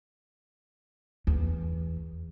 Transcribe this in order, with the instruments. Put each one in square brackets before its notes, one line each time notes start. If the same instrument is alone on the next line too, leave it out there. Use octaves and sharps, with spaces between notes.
[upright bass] E2